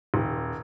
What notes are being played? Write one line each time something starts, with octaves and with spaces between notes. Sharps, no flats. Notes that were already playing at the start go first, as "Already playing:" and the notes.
D#1